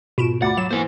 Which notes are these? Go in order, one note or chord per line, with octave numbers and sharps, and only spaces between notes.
G#2 B2 F4 D7 E7
D2 F4 F#4 F#5 B5 D6 A6
F#3 E7
E3 A#3 C5 G#5